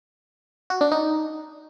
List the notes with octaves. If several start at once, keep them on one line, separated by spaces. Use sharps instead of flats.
F#4
D4
D#4